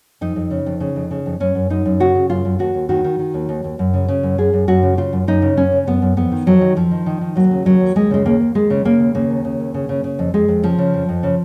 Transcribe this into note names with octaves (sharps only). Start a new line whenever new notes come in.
F2 D#4
F2
C#3
F2
C#3
F2
C#3
F2
F#2 C#4
F#2
F#2 D#4
F#2
C#3 F#4
C#3
F#2 F4
F#2
D#2 F#4
D#2
D#3 F#4
D#3
D#3
D#2
D#2
D#2
F#2
C#3
C#3
F#2
F#2 G#4
F#2
F#2 F#4
C#3
C#3 F4
F#2
F#2 D#4
C#3
F#2 C#4
C#3
F#2 B3
F#2
F2 B3
D#3
F2 F#3
D#3
F2 F3
D#3
D#3
D#3
D#2 F#3
C#3
D#2 F#3
D#2
D#2 G#3
C#3 G#3
D#2 A#3
D#2
D#2 G#3
C#3
C#3 A#3
D#2
C#3 A#3
D#2
C#3
D#2
C#3
C#3
C#3
F2
F2 G#3
F2
C#3 F3
C#3
F2
F2
C#3